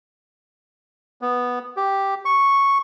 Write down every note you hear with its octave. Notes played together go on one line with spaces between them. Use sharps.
B3
G4
C#6